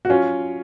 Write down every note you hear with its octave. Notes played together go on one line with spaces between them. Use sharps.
F#4
F#3 C#4 F4